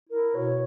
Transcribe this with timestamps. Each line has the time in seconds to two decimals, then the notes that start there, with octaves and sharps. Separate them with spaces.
0.10 E4 A#4
0.35 B2 C#5